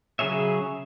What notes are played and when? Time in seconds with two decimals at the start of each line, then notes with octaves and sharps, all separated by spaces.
0.19 C#3 F#3 G#4 C#5 E5